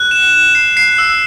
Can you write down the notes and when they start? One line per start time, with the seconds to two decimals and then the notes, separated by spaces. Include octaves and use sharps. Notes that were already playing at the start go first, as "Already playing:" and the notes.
Already playing: F#6
0.11 E7
0.32 E7
0.55 C7
0.77 C7
0.98 E6